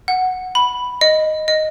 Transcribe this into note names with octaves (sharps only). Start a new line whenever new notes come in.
F#5
B5
D#5
D#5